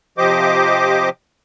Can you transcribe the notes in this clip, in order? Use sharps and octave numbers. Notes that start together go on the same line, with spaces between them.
C3 F3 G4 C5 D#5 D6